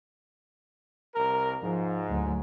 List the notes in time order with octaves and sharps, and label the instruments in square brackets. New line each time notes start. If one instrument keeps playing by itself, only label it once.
[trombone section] C2 A#4
[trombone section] G#2 [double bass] F3
[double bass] D2 F#3